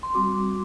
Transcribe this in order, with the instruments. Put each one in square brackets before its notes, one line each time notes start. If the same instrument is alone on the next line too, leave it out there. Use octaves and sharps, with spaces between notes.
[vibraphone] C6
G3 C4 F#4 D6